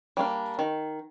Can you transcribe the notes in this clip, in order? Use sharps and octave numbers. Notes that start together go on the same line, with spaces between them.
G3 A#3 D4
D#3